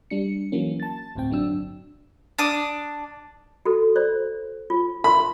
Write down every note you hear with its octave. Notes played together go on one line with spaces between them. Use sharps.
G3 D4 C#7
E3 F#3 A#3 C#4
A5 A6
G1 D2 A2 C4 G5
G1 F#3 D4 E6
D4 D6 D#6
F#4 A4
C5 D5
F4
A#4 B5 C6